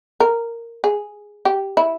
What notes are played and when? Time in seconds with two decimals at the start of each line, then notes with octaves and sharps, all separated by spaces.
0.20 A#4
0.84 G#4
1.45 G4
1.77 E4